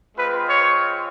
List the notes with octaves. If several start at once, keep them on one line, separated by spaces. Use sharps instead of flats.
G#3 C4 F4 B4
C#5